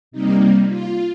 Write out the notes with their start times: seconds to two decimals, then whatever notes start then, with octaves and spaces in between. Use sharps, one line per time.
0.11 C3 G3 A#3 D#4
0.68 F4